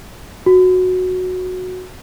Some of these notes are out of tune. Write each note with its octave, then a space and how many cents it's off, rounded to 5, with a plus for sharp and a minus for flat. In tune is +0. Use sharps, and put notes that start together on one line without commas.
F#4 -10